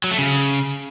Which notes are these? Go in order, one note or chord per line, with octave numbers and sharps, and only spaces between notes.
F#3
A3
C#3